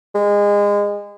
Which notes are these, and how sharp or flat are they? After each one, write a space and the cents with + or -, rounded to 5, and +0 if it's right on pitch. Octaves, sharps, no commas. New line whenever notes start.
G#3 -25